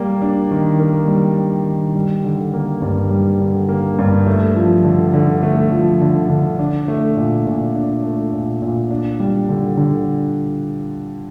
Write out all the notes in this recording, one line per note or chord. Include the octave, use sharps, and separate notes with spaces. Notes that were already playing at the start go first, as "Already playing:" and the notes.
Already playing: G3 A#3
D4
D#3
A#3
G3
D4
D#3
G3
D3
A#3
G2
G3
D3
A#3
G2
A3
F3
D3
D3
A3
F3
D3
D3
D4
A3
A#2
A#2
D4
A3
A#2
A#2
D4
G3
D3
D3